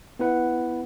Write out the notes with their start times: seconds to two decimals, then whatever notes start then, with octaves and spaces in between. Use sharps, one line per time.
0.19 B3 E4 B4 F#5